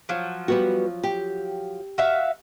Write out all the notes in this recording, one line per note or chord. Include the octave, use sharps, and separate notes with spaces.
F3 F#3
G3 B3 F#4
G4
F#4 E5 F5